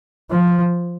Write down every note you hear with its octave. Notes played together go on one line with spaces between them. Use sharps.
F3